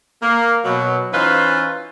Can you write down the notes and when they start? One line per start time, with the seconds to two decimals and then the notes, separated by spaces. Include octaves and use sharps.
0.22 A#3
0.64 B2 F#3
1.12 E3 C#4 D#4 F4 B4 C5